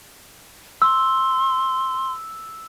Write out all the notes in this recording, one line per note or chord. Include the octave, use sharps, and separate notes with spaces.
C6 E6